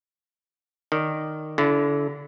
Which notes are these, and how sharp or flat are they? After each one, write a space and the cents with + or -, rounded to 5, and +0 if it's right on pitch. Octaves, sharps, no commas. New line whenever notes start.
D#3 -10 D5 -10
D3 -30 E4 +20